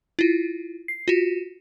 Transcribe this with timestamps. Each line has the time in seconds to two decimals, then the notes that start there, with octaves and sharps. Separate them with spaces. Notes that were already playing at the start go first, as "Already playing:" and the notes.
0.19 E4 F4
0.88 C7
1.08 F4 F#4